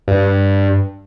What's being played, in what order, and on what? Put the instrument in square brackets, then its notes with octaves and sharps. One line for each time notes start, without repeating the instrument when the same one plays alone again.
[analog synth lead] G2